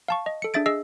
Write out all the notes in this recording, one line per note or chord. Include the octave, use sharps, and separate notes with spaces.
F5 A5 C#6
D#5
A4 C#7
D4 G#4 E5 A6 D7
G#4 D#5 E6 C7